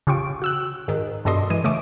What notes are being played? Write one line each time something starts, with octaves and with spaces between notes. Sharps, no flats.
C#3 F4 G4 C#6 D7
F#4 E6 F#6
G#2 D#3
G2 B2 A4 D5 D#5 C6
E3 G#3 D#7
C#3 A3 C#6 D6 D#7